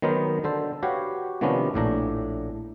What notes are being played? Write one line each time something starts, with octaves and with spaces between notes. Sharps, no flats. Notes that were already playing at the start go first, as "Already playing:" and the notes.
D#3 F#3 B3 D#4 A#4 C5
D3 A4 C5
F#4 G4 B4 C#5 F5 F#5
C3 D#3 F3 B3 C#4 D4
A#1 A2 D4 A#5